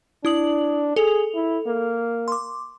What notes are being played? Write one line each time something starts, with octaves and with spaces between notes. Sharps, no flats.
D4 E4 D#6 F#7
G#4 A4 F7
E4
A#3
C6 D6